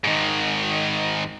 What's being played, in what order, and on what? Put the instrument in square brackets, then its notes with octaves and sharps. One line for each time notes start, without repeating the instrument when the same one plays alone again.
[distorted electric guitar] G#2 D#3